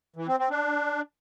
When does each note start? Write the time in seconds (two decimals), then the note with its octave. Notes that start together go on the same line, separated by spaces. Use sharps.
0.16 E3
0.28 C4
0.39 C4
0.50 D4